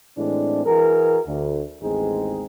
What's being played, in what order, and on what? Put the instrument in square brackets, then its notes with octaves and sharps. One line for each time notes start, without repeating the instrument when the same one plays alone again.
[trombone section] A2 E3 G#3 C4 D4
E3 F#4 G#4 A#4
D2
A1 D#2 G#3 C4 D#4 G#4